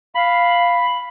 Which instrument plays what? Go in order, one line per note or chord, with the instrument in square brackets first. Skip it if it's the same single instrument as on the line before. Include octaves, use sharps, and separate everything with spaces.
[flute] F5 [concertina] B5